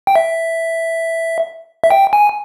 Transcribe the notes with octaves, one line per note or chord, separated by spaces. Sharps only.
G5
E5
E5
G5
G#5